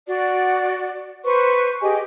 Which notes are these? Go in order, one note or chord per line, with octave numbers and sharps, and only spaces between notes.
F#4 D5
B4 C5 C#6
G4 G#4 D#5 G#5